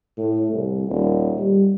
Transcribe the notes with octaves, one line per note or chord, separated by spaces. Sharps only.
A2
C2
D#1
G3